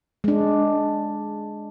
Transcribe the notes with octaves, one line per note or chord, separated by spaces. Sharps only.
G#3 D4